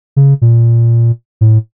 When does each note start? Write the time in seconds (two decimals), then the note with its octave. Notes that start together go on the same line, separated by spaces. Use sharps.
0.16 C#3
0.42 A#2
1.41 A2